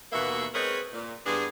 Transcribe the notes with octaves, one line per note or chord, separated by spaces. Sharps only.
D#2 B2 E3 A#3 F#4 E5
G#3 C4 G#4 A#4 B4 C#5
A#2
E2 G2 B3 D4 G#4